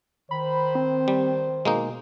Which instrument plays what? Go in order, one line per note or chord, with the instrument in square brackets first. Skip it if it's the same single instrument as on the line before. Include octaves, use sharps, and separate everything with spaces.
[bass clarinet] D#3 [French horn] C5 [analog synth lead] B5
[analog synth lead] C4
[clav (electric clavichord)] G3
[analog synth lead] B2 [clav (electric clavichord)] G#3 A#3 D#4